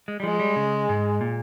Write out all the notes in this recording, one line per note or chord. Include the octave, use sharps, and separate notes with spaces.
G#3
G3
F3 G#3
G3
C#3
G#2
A#2